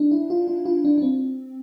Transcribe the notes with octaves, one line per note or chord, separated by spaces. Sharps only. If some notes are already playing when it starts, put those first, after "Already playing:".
Already playing: D4
E4
F4
F4
F4
D4
D4
C4